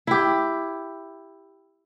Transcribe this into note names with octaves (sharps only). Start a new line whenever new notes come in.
E4 G4